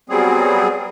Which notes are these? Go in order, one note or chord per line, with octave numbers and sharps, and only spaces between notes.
F#3 G3 B3 C4 G#4